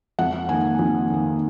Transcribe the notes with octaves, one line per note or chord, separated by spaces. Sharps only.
F2 F#5
D#3 A#3 G#5
F2
D#3 A#3